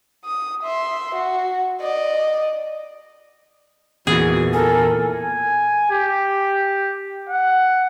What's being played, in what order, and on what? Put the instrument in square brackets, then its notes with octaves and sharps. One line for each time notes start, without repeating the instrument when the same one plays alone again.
[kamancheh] D#6
E5 C6
F#4
D5 D#5
[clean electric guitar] E2 A#2 E3 [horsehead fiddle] F#4 [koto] G#4
[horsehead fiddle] A4 A#4 [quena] G#5
[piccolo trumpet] G#5
G4
F#5